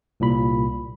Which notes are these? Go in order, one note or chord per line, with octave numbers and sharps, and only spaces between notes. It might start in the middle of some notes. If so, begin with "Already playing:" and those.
C2 A#2 B5